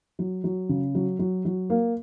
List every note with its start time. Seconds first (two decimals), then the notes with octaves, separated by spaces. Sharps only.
0.19 F#3
0.44 F#3
0.69 C#3
0.95 F#3
1.19 F#3
1.45 F#3
1.70 A#3